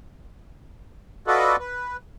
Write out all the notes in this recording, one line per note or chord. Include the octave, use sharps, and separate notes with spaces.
F4 F#4 A4 B4 D5 D#5
B4